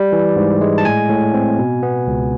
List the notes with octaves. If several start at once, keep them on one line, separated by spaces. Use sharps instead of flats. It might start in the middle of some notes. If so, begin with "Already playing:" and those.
Already playing: G3 D5
E3
G#2
G#3
A5
A2 G#5
A2
C4
B2
B3
C#2